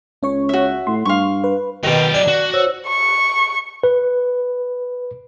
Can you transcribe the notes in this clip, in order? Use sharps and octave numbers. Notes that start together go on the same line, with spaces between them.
C#2 C#4 C#5 C#6
F#4 E5
A2 C6
G2 F5 C#6
B4
B2 D#3 F#3 G5
D4 D5
F#4
C5 C#5 E6
C#6
B4